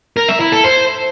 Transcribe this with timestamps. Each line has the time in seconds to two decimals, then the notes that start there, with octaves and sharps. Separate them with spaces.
0.17 A#4
0.28 E5
0.40 E4
0.52 A4
0.64 C5